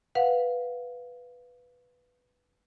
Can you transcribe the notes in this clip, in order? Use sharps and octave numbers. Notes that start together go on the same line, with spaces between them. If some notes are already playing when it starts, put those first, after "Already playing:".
B4 F5 F#5